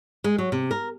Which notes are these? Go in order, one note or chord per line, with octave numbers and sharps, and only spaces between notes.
G#3
F#3
C3
A#4